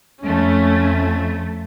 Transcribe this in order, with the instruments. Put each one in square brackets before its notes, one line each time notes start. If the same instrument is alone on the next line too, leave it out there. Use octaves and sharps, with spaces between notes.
[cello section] F2 A3 [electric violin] C#4